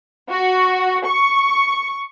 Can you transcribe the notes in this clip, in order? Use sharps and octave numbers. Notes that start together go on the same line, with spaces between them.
F#4
C#6